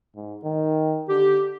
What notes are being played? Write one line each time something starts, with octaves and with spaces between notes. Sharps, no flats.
G#2
D#3
D3 G4